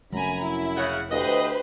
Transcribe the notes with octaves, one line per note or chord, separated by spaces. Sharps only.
F1 F#2 G#5 A#5 B5
E4
C#3 F#5
D2 G4 B4 C5 D#5